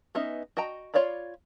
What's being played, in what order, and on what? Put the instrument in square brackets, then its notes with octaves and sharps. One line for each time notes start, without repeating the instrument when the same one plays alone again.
[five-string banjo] B3 C#4 D#4 D#5 E5
F#4 D#5 G5 A#5
F4 C#5 D5 F5 B5